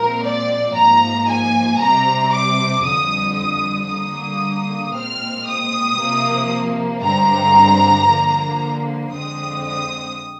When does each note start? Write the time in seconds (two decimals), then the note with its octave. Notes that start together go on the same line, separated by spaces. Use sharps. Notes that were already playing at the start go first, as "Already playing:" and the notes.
Already playing: A#2 F3 G#3 C4 A#4
0.23 D5
0.76 G#2 F3 A#3 A#5
1.28 G#5
1.80 C3 G3 C4 A#5
2.32 D6
2.84 F2 D3 G3 D#6
3.37 D#6
3.89 D3 G3 A#3 D#6
4.93 A#2 G#3 C4 F6
5.46 D#6
5.98 C3 F3 A#3
7.02 G2 D3 G#3 C4 A#5
8.07 D3 F3 A#3
9.11 F2 D3 G#3 C4 D#6
9.63 D#6